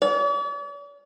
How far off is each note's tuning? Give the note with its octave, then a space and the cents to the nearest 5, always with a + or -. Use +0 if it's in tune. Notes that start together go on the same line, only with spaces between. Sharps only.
D5 -45